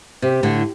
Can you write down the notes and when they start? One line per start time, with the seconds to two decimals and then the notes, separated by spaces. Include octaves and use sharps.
0.22 C3 G4
0.43 A2 D3